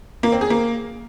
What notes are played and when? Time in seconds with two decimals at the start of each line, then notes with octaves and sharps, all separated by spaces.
0.23 A#3
0.32 C4
0.41 G#4
0.50 A#3